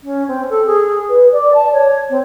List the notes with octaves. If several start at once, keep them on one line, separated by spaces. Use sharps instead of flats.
C#4
C4
A4
G#4
B4
D5
A5
C#5
C4